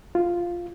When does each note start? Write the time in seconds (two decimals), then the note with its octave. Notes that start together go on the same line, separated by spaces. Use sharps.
0.15 F4